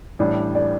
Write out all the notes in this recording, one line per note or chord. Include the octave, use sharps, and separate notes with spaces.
A1 A2 G3 D4 D5
D5